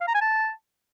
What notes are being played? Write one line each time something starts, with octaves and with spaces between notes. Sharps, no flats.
F5
A#5
G#5
A5